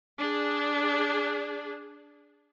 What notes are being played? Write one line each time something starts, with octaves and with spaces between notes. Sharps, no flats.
D4 G#4